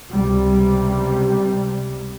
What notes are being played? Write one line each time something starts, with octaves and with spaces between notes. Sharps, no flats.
C#2 C3 G3